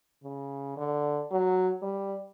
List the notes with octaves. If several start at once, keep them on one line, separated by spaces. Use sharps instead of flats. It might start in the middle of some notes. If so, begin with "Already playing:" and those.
C#3
D3
F#3
G3